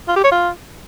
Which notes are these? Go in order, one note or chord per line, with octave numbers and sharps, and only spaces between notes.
F4
G4
C#5
F4